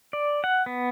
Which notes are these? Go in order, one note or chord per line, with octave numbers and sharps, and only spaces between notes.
D5
F#5
B3